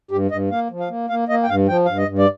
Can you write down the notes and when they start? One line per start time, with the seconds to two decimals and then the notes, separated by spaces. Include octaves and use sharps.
0.11 G2 G4
0.31 G2 D#5
0.50 A#3 F5
0.71 F3
0.80 F5
0.89 A#3
1.09 A#3 F5
1.29 A#3 D#5
1.43 G5
1.49 G2 F5
1.68 F3 G5
1.85 G2 F5
1.98 D#5
2.08 G2
2.18 D5